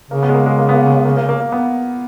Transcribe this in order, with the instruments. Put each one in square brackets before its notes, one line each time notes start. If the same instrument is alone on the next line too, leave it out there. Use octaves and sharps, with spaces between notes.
[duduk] C#3 [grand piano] A#3
[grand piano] B3
G#3
A#3
G#3
A#3
B3
A#3
G#3
A#3
A#3
A#3
A#3
B3